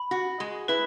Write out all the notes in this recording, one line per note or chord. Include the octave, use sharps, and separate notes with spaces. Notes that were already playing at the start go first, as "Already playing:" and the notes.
Already playing: B5
F#4
G#3
E4 B4